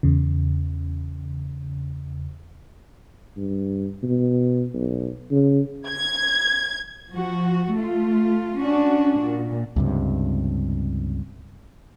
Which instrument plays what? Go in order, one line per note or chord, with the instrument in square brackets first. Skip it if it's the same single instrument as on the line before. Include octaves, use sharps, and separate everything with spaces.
[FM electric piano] E2 C#3
[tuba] G2
B2
B1
C#3
[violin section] G#6
[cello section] F3 F#4
A3 F4
C#4 D4 F#4
A#2
[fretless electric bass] C#2 G2 C3